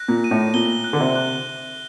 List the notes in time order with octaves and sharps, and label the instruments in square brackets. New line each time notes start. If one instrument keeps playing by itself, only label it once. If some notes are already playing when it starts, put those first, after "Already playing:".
Already playing: [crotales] F#6 A#6
[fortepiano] A#2
[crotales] D#7
[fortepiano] A2
[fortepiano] A#2 [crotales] G7
[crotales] F#6
[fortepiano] D3
C3
[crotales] F#6